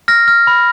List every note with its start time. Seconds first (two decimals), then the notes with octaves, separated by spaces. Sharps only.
0.08 F6 A#6
0.28 F6
0.47 B5